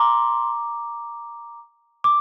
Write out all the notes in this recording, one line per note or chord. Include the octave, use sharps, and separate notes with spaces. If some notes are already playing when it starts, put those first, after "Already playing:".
Already playing: A#5 C6 D6
D6